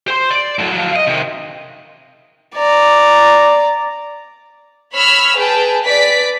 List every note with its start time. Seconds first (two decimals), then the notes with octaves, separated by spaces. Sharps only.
0.08 C5 C6
0.30 D5
0.59 A2 F#3
0.72 F3 F#3
0.96 D#5
1.07 C3 D#3
2.55 D5 A#5
4.95 C#5 B5 E6 F6
5.36 G#4 B4 G5 A5
5.83 B4 D5 B6